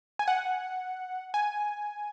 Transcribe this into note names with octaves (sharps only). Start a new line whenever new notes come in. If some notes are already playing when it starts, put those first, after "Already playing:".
G#5
F#5
G#5